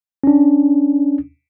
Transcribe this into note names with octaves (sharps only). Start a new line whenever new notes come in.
C#4 D4